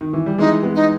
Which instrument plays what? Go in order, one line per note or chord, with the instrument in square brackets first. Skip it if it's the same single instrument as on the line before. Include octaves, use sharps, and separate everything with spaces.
[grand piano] D#3
E3
G3
[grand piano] E3 G#3 [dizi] D#4
[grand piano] G#3 B3
[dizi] D#4